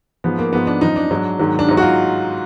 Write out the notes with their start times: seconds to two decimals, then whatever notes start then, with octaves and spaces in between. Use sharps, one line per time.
0.24 G#2 F3 B3
0.39 A#3
0.53 G#2 F3 B3
0.67 D4
0.81 F#2 F3 D#4
0.96 D4
1.11 G#2 F#3
1.39 G#2 D#3 F#3
1.59 D4
1.68 G#2 F#3 D#4
1.77 F#4
1.82 F4